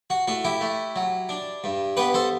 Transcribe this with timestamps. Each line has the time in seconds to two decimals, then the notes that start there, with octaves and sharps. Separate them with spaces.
0.10 F#4
0.27 A2 F#4
0.45 E4 G4
0.61 A3
0.96 F#3
1.29 D4
1.64 G2
1.97 B3 G4 B4
2.14 A4 C5